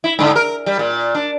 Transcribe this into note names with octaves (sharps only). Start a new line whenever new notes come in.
E4
G#2 D3
A#4
G3
A#2
D4